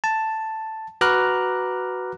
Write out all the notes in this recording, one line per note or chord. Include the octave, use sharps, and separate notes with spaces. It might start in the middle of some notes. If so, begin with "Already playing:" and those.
A5
F#4 B4 A#5 D6 F6 F#6